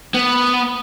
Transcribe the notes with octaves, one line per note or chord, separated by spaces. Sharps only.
B3